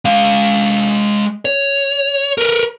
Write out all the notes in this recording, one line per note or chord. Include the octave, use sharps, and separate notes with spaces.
G#3 F5
C#5
A#4 B4